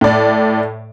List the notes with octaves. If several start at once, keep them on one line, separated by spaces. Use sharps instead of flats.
A2 D5